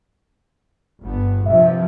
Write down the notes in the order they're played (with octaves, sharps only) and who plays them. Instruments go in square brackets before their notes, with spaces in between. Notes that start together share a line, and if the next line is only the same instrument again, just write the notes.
[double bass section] G1 B3
[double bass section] G2 C3 F3 [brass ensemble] E5